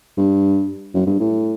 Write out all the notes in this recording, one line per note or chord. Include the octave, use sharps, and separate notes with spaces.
G2
F#2
G2
A2